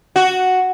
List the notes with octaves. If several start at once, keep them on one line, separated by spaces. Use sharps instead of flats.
F#4